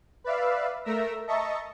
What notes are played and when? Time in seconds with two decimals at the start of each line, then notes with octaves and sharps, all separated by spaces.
0.24 B4 D5 E5 F5
0.85 A3 A#4 E5 E6 A#6
1.27 D#5 E5 A5 A#5 C#6